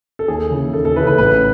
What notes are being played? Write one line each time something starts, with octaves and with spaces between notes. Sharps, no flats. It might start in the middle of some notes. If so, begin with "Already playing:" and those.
A4
D#2 G#4
C#3 E3
D#2 A4
A4
C#3 E3 B4
B4
A1 B4